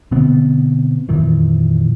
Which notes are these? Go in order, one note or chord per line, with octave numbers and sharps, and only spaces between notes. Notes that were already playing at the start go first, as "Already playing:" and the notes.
B2 D3 B3 C4
F2 A#2 D#3 E3